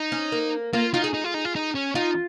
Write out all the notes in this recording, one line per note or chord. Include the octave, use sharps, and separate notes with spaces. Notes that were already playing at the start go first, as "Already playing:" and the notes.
Already playing: D#4
C#4
A#3
A#3 F4
D#4 F4
G#4
D#4
F4
D#4
F4
D#4
C#4
D#4 F4